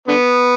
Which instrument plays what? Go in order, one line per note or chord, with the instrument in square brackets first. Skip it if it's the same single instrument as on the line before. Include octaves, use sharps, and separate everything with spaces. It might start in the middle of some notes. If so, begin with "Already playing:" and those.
[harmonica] D3 B3